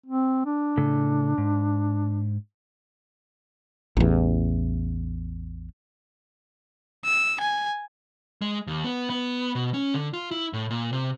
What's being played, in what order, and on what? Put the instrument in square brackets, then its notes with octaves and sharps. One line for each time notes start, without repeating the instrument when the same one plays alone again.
[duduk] C4
D4
[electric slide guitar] A2 C#3 A4
G#2
[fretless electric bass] A1 E2
[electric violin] E6
G#5
[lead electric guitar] G#3
D#2
B3
B3
B2
C#4
D3
F4
E4
A2
A#2
C3